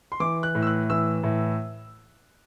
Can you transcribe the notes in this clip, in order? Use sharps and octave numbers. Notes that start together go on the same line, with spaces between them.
C6
E3 D6
F#6
A2
E6
F#6
E3 E6
A2